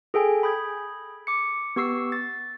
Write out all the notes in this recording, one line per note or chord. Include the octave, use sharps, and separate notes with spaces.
G#4 A4 G5 G#5
B5 D#6 G6 G#6
D6 C#7
B3 G4 C#6 E6 C7
A6